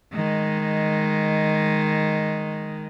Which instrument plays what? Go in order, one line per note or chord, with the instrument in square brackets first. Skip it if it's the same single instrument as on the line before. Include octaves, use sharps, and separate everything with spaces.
[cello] D#3 G#3